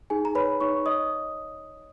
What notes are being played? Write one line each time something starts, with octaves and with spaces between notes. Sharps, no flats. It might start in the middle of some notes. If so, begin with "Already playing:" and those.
D#4 G#4 G#5
A#5
B4 C#5 B5
D#4 C#5 C#6
C#5 D#5 D#6